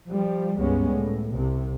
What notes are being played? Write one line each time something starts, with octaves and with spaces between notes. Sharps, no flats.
F3 G3
C#2 G2 G3 G#3 B3 C#4
A2
C2 C3